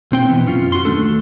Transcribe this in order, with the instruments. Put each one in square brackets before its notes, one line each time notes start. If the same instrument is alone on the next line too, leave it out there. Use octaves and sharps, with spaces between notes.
[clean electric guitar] B1 C4 G5
B2 E3 B3
F#2 C#4 F4
F#4 C6
D#2 B2 A3 D4 A4